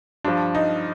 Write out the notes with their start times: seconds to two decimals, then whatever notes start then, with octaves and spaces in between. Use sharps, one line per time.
0.24 G2 F3 D4
0.55 D#4